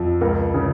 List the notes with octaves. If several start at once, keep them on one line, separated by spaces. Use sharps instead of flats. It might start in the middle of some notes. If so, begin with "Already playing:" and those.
Already playing: F2
C#2 A#4
C#3